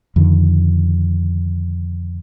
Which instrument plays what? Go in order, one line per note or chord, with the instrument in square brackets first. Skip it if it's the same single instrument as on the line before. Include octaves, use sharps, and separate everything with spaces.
[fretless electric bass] F2 D3 D#3